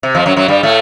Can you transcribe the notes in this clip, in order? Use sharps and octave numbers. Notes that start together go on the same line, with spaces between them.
C3
F2 F3
F#2 F#3
F#2 F#3
G2 G3
A2 A3